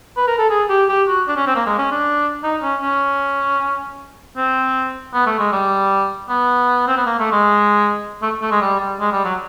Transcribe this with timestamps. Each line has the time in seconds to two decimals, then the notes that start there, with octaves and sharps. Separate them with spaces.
0.17 B4
0.27 A#4
0.38 A4
0.50 G#4
0.69 G4
0.89 G4
1.08 F#4
1.28 D4
1.37 C#4
1.47 C4
1.56 A#3
1.66 G#3
1.78 C#4
1.91 D4
2.43 D#4
2.63 C#4
2.82 C#4
4.37 C4
5.14 B3
5.26 A3
5.39 G#3
5.52 G3
6.29 B3
6.87 C4
6.97 B3
7.06 A#3
7.20 A3
7.32 G#3
8.22 A3
8.42 A3
8.51 G#3
8.61 G3
8.80 G3
9.00 G#3
9.12 G3
9.25 F#3